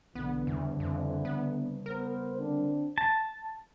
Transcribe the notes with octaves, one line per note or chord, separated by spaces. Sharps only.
A#1 B2 D3 E3 B3
E2 C#3 G3
F2
B3
B3 A#4 C5
D3 C4 D4
A5